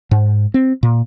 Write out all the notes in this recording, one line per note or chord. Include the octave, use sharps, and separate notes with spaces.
G#2
C4
A#2